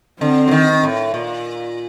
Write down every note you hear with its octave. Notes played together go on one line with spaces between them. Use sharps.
D3 C4
F#3
D#3
A2
A#2